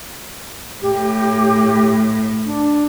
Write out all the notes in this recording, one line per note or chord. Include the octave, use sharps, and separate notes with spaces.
A2 G4
D4